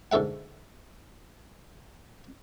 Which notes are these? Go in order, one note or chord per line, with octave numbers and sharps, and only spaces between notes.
G#2 D3 A4 E5 F#5